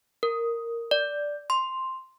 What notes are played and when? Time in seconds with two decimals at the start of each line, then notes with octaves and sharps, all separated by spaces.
0.23 A#4
0.91 D5
1.50 C6